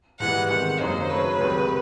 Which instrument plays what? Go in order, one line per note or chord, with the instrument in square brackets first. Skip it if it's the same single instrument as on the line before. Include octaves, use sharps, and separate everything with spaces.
[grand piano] G#2 E3 G3 B3 [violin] F#5
[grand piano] C3 D#3 G#3 [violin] F#5
[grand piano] F#2 D#3 F#3 A#3 D#4 [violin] C5
[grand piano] C#3 F#3 A3 C#4 [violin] B4
[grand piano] C#2 C3 D#3 G3